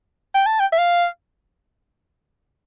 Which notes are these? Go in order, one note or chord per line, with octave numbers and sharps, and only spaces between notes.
G5
A5
G5
E5
F5